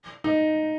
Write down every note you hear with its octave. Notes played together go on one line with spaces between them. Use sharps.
D#4